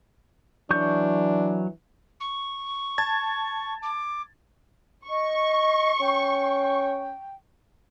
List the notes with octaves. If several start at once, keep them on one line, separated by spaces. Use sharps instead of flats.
E3 F#3 D4 C#6 G6
C#6
A5 G#6 A6
D6
D#5 C#6
C#4 G5